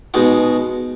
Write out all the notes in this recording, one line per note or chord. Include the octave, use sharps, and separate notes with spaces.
B2 G#3 D#4 F#4